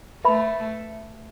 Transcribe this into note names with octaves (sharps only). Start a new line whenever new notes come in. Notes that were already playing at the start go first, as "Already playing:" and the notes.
A3 B4 E5 B5